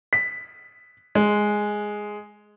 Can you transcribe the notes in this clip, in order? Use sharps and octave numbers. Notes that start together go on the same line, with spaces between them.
B6
G#3